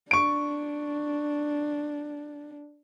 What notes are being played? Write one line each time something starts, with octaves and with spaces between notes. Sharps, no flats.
D4 C#6 D7